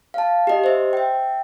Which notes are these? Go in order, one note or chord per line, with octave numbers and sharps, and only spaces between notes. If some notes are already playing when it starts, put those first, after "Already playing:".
F5 A5
G4 D#5
C5 E5
E5 G5